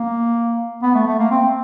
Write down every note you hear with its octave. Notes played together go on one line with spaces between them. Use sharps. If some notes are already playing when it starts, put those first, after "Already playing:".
Already playing: A#3
B3
A3
A3
A#3
C4